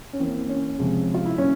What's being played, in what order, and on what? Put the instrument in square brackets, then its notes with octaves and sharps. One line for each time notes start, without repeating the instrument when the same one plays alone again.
[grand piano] C#4
E3 A#3 C4
C#4
C3 F3 G#3
F4
E4
A#2 G3 C#4